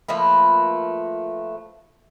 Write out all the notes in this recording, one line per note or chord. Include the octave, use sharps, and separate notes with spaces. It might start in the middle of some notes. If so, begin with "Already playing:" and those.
F3 A3 A#3 B4